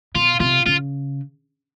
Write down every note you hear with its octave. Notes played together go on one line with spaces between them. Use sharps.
B2 F4
C3 F4
C#3 F4